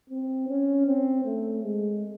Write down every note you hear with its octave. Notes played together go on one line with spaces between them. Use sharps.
C4
C#4
C4
A3
G#3